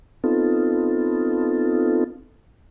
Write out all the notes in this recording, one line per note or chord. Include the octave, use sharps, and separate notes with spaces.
B3 C4 D#4 F4 A4